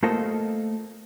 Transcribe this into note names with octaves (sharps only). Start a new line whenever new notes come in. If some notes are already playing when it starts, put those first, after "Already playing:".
A3 A#3 F4 A4 C5 D#5